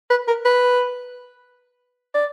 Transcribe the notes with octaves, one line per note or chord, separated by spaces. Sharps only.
B4
A#4
B4
D5